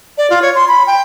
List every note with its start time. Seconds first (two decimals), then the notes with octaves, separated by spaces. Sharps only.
0.18 D5
0.30 F4
0.42 C#5
0.55 C6
0.68 B5
0.87 G5